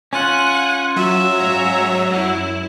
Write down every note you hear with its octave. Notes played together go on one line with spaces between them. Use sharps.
C#4 F4 F#5 G#5
F#3 E5
G#2 C#5 A#5
F#2 E4